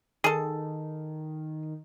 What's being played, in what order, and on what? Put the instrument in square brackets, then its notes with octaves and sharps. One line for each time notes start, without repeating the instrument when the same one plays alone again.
[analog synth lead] D#3 [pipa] G#4 A4